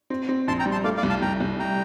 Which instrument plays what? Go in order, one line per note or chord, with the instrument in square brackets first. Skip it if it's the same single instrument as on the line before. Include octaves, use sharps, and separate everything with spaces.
[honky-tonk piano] C4
C4
[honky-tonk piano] A#1 [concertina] A5 C6
[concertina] G5 A#5
[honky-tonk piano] G3
[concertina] A5 C6
[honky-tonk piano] A3 [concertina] D5 F5
[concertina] D5 F5
[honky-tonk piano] C2
[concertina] F5 A5
[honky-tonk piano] C2 [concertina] G5 A#5
[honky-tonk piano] C2
[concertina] G5 A#5